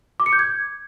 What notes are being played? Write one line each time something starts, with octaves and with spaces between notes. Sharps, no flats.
D6
C#7
G6
G#6